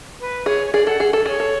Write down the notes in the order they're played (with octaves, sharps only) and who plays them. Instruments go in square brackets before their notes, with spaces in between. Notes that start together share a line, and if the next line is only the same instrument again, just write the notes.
[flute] B4
[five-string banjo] G#4 [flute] C#5
[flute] C#5
[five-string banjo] G#4 [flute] D5
[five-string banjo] A4 [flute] F#5
[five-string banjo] G#4
A4
[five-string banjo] G#4 [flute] C#5
[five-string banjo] A4